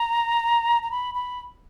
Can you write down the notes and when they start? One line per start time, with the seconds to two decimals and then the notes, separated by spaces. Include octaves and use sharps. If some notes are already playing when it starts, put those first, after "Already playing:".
Already playing: A#5
0.83 A#5
0.91 B5
1.15 B5